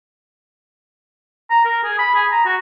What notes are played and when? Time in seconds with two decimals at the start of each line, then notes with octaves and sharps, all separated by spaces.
1.50 A#5
1.65 A#4
1.83 G#4
1.99 B5
2.15 G#4
2.31 A#5
2.46 F#4